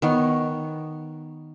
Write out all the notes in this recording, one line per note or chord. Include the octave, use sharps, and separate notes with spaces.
D#3 B3 C#5